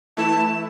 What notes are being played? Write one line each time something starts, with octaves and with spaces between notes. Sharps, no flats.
E3 A3 E4 A5